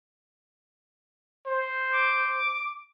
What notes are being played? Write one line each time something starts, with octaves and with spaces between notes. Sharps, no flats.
C5
D6